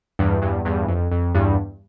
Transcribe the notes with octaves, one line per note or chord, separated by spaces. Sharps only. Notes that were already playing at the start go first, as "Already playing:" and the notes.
E2 G2
E2 G2
E2 G2
F2
F2
E2 G2